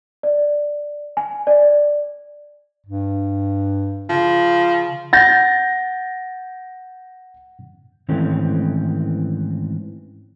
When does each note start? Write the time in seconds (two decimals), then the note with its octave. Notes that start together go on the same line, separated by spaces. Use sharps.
0.23 D5
1.17 G#5
1.47 D5
2.87 G2
4.09 C#3 F3
5.13 F#5 G6 A6 A#6
8.09 G#2 D#3 E3 A3 C4 C#4